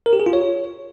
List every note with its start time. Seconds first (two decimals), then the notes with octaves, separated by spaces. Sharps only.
0.06 A#4
0.13 G4
0.20 G#4
0.26 F4
0.33 C#5